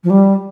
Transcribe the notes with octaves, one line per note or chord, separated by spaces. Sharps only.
F3
G3